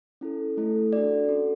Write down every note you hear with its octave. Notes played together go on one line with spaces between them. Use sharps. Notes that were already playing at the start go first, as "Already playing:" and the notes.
C#4 E4 A4
A3 E4 A4
D4 F#4 A4 D5
C#4 F#4 A4